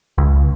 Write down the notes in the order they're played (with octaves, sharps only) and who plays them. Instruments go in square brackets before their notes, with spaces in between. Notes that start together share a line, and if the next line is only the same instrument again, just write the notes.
[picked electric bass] C#2